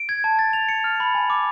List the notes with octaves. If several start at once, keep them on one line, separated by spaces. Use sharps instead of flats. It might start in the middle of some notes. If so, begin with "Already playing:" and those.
Already playing: D7
G#6
A5
A6
F7
C#7
F6
B5
G#5
D6